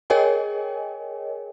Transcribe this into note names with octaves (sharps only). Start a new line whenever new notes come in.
G#4 A#4 C#5 D#5 G5 G#5